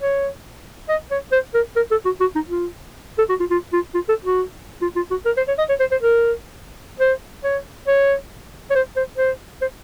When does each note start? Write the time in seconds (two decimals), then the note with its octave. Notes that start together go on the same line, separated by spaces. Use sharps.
0.01 C#5
0.89 D#5
1.11 C#5
1.32 C5
1.54 A#4
1.76 A#4
1.91 A4
2.05 F#4
2.20 F#4
2.35 D#4
2.48 F4
3.18 A4
3.29 F#4
3.40 F4
3.50 F4
3.73 F4
3.94 F4
4.09 A4
4.24 F#4
4.82 F4
4.96 F4
5.11 F#4
5.26 A#4
5.37 C5
5.48 C#5
5.58 D#5
5.69 C#5
5.80 C5
5.91 C5
6.02 A#4
6.99 C5
7.44 C#5
7.87 C#5
8.70 C#5
8.75 C5
8.96 C5
9.18 C5
9.61 C5